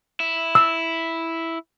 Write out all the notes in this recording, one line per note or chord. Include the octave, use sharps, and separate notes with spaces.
E4
E6